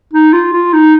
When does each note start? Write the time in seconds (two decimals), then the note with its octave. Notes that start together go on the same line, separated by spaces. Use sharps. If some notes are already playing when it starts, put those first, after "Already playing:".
0.13 D#4
0.33 F4
0.53 F4
0.73 D#4